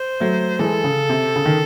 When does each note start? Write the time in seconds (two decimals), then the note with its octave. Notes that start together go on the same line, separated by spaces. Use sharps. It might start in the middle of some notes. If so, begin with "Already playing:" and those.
Already playing: C5
0.20 F#3 A3
0.59 E3 G#3 A4
0.84 C#3
1.09 C3
1.36 C#3
1.46 D#3